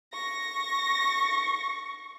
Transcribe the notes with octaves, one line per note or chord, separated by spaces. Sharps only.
C#6 A#6